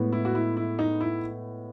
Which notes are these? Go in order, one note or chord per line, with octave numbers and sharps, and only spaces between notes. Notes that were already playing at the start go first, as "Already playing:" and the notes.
Already playing: A2 G#3 B3
E4
F#4
E4
E4
D#4
E4